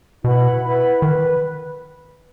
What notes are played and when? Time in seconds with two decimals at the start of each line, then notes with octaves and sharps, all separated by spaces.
0.24 B2 E4 B4 F#5 B5
0.63 E4 B4 F#5 B5
1.02 D#3 B4